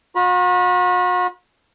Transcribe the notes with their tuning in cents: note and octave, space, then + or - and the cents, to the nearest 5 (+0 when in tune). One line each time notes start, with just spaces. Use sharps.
F#4 -45 B5 -40